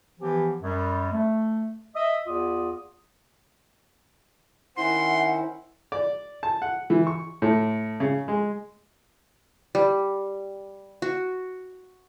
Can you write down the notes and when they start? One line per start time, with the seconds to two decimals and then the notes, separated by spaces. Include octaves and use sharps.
0.20 E3 F3 B3 G4
0.63 F#2 G3
1.12 A3
1.96 D#5 E5
2.27 E2 F4 D5 D#6
4.77 D#3 C#4 E4 C5 F#5 C6
5.92 D5
6.43 A5
6.62 F#5
6.90 E3
7.07 C#6
7.42 A2
8.00 C#3
8.28 G#3
9.75 G3
11.02 F#4